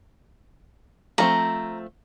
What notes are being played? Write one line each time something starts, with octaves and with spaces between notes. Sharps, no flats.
F3 A3 C4 A#5